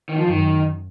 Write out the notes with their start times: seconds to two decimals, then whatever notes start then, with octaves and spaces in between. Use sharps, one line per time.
0.09 D#3
0.17 F3
0.26 F#2 D#3